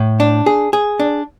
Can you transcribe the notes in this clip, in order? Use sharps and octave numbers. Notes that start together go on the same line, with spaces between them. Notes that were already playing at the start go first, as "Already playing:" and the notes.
Already playing: A2
D4
G#4
G#4
D4